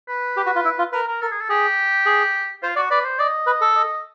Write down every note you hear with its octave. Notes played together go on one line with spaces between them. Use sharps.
B4
G4
F#4
F4
E4
F4
A#4 B4
A#4
A4 A#4
G#4
A4
G4 G#4
G#4
F4 C5
F#4 D5
B4 D5
C5
D5 D#5
B4
A4
D#5